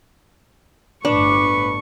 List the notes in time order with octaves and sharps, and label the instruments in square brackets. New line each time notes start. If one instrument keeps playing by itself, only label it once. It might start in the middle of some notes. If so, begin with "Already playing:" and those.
[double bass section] G1 A2 [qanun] D4 [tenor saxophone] B4 [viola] C#6